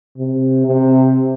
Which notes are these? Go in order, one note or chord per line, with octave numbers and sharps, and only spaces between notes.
C3
C3